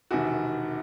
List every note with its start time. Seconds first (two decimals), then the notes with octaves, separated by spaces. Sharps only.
0.11 E1 E2 C3 D#3 F#4